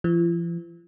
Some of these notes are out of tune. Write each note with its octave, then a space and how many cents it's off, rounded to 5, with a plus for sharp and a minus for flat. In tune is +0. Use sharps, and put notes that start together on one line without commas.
F3 -45